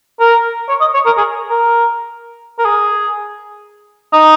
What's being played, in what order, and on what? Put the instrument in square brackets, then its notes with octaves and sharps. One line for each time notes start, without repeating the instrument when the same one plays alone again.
[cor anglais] A#4
C#5
D#5
C#5
A#4
G#4
A#4
A#4
G#4
D#4